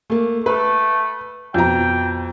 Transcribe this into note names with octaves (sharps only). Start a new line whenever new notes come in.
A3 A#3
A3 B4
F2 B2 G5 A#5